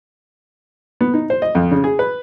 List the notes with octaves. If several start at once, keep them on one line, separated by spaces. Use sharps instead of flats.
B3
D#4
C5
D#5
F2
C#3
G#4
B4